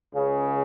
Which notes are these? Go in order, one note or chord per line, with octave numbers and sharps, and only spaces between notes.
C#2 C#3